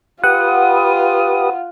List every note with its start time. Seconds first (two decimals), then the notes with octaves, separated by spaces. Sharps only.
0.24 F4 G4 B4 F#5 D#6